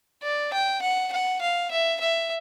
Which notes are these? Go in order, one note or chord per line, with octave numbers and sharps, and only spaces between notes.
D5
G5
F#5
F#5
F5
E5
E5